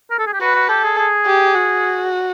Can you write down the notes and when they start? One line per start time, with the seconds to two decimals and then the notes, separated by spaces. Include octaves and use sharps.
0.11 A#4
0.19 A4
0.27 G#4
0.33 G4
0.41 F#4 B4
0.55 F#4
0.69 G4 A4
0.84 G#4
0.98 G#4
1.26 G4
1.54 F#4